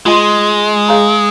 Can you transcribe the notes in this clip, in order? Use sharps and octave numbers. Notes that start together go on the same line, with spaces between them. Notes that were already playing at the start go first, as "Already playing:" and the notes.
G#3 F4 G#4 D#5 G#5 C6
G#4 C#5 F5 A#5